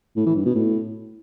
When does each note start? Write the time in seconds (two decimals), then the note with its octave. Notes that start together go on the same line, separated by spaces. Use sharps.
0.17 A2
0.26 E3
0.36 G2
0.46 B2
0.55 A2